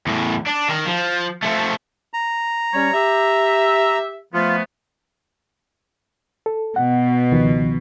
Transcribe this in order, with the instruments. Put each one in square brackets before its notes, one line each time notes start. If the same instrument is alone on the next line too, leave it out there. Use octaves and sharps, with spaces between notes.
[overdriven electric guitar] E2 A2
D4
D#3 A#4
F3
F3 A3
[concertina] A#5
[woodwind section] G3 C#4 C#5
G4 E5
[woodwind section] F3 A3 B3 [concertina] F4
[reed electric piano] A4
[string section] B2 [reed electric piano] F#5
[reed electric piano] C#2 D#3 F3